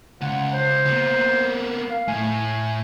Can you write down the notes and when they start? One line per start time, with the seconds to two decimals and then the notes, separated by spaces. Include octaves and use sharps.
0.21 C#2 F4 F#5
0.53 C5
0.85 A#3 B3
1.89 F5
2.08 A2 G#5